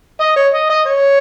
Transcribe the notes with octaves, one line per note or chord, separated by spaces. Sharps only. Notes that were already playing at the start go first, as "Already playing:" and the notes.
D#5
C#5
D#5
D#5
C#5